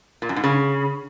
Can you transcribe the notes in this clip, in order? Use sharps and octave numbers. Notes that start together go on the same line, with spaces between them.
A#2
F#2
G#2
C#3